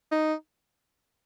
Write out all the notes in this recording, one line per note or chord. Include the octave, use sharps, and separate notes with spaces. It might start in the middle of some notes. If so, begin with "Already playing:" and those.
D#4